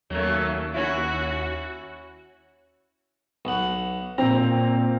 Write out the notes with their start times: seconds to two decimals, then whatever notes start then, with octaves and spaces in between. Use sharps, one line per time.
0.10 D#2 F#3 A3 A#3 C#4
0.74 C#4 E4 F#4
3.45 B1 F#5
4.18 A#2 C4 A#5